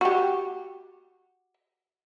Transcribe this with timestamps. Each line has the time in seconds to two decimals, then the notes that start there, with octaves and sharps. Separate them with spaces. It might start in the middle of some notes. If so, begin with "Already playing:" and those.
0.01 F#4 G4